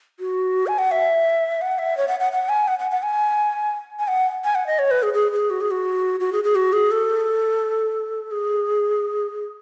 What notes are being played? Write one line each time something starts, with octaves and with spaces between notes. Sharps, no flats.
F#4
G#5
F#5
E5
F#5
E5
C#5
F#5
F#5
F#5
G#5
F#5
F#5
F#5
G#5
G#5
F#5
G#5
F#5
D#5
C#5
B4
G#4
G#4
G#4
F#4
G#4
F#4
F#4
G#4
G#4
F#4
G#4
A4
G#4